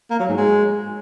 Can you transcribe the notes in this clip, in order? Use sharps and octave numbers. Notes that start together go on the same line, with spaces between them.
A#3
F#3
G#2
G#3